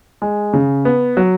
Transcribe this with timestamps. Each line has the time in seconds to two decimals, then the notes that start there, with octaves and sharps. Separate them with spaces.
0.22 G#3
0.53 C#3
0.85 B3
1.17 F#3